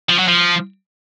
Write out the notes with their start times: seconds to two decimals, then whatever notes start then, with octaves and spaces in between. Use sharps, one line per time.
0.10 F3
0.19 F#3
0.28 F3